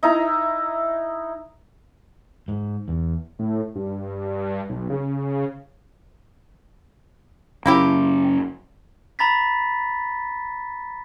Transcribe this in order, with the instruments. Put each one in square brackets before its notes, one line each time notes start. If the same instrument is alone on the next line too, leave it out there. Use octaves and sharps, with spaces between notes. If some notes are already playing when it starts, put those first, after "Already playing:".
[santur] D#4 E4 A#5
[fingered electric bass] G#2
E2
[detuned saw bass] A2
G2
B1
C#3
[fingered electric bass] F#2 C#3 [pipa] A#3 E4 G4
[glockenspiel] A#5 B5 A6 B6